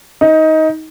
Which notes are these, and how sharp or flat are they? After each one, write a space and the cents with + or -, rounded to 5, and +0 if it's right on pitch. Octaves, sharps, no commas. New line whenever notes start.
D#4 +20